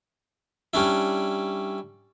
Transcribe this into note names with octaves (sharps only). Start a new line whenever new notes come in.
G3 C#4 D4 E4